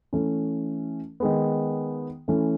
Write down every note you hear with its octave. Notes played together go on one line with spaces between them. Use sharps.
E3 A3 C#4
D#3 G#3 B3
E3 A3 C#4